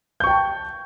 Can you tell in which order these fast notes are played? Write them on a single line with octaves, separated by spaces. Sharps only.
G6 C#6 G5 A5